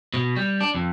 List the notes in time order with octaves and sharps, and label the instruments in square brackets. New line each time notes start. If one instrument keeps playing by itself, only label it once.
[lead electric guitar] B2
G3
D4
F2